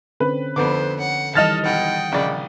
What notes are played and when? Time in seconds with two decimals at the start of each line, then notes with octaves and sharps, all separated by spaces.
0.20 D3 C4 C#4 B4
0.56 F2 D3 B3 A4 C5 D6
1.00 C#5 F#5
1.35 D#3 E3 G3 A4 D#5 F6 A6
1.65 B1 F#5 G5
2.12 A#1 C#3 D5